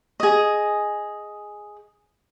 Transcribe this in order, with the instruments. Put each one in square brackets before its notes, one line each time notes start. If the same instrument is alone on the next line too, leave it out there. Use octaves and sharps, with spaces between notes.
[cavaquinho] G#4 D#5